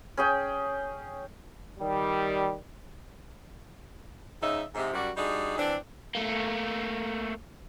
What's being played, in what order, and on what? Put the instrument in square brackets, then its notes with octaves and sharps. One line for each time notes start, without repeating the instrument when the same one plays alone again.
[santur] C#4 G#4 G5
[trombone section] D#3 G3
[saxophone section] G#2 C#3 D#4 E5
G#2 C3
F#2 G3 F#4 D5
G3 D4 D#4 F#4 G#4
E3 C4 D4
[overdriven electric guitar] A3 A#3